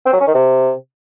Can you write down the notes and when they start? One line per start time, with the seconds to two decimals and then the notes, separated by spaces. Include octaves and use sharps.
0.06 C4
0.13 F#3
0.20 C#4
0.27 D#3
0.34 C3